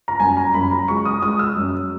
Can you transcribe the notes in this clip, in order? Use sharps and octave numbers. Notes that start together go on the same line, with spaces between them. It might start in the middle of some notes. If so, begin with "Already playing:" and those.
A#5
F#2 G#5
A#5
F#2 B5
A#5
G#3 C#6
D#6
G#3 D#6
E6
F#2